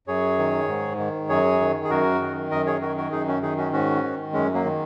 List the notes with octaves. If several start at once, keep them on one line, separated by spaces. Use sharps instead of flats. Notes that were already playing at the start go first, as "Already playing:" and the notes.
F#2 G#4 C#5
D#3
G#2
D#3
F#2 G#4 C#5
D#3
G#4
F#2 F#4 A#4
D#3
F#2 A#4 D#5
G#4 C#5
D#3 F#4 A#4
F#4 A#4
F#2 D#4 G#4
C#4 F#4
D#3 D#4 G#4
C#4 F#4
G#2 C#4 F#4
D#3
F#2 G#3 C#4
F#3 A#3
D#3